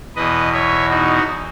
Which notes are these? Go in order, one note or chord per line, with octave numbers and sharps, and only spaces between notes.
E2 B2 B4 D#5
C#5 E5
D#4 F#4